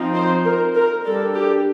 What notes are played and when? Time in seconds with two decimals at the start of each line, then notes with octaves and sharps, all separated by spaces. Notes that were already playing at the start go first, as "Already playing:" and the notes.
Already playing: F3 C4 D#4
0.15 C5
0.45 A#4
0.75 A#4
1.05 G3 D4 A4
1.35 G4